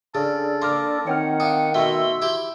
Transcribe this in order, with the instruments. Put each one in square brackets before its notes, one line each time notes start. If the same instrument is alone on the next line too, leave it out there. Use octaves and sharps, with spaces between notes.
[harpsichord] C#3 [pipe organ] D4 A4 D5 [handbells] G#4
[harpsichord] A#3 [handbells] C6 D6 F6
[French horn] D#3 [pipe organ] C4 F#5 [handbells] C#5 G5 F6
[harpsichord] D4 [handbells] F5 G5 D#6
[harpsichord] B2 A3 [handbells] F#4 E5 [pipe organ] C6 E6
[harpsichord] E4 G4